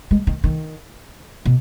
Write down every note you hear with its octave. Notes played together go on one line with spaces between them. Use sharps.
G#3
D#3
D#3
B2